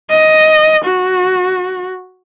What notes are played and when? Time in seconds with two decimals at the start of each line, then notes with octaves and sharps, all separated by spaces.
0.10 D#5
0.85 F#4